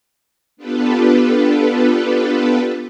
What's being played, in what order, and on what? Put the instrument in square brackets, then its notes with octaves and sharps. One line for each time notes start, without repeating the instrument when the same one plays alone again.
[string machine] B3 D4 F4 G4 A4 B4